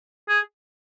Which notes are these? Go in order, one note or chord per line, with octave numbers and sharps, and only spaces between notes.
G#4